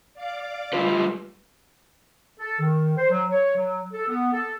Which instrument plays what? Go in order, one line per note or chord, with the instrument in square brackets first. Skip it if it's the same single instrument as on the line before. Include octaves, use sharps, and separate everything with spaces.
[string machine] D5 F5 D6
[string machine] G3 [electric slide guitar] A3 F4 B4
[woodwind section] A4
D#3
C5
F#3
C#5
F#3
A4
B3
A4